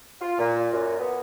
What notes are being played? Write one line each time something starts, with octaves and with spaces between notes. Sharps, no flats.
F4
A#2
F#2
B3